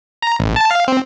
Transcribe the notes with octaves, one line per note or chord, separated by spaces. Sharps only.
A#5
A1
A5
F5
C4